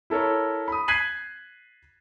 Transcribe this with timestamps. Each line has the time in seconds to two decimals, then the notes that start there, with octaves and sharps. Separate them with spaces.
0.10 E4 A4 A#4 C#5
0.68 B5 D#6
0.88 F#6 G#6 B6 C7 D#7 F#7